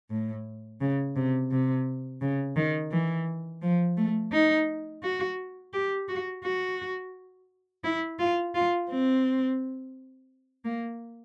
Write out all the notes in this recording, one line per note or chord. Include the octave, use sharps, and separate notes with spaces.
A2
C#3
C3
C3
C#3
D#3
E3
F3
A3
D#4
F#4
G4
F#4
F#4
E4
F4
F4
C4
A#3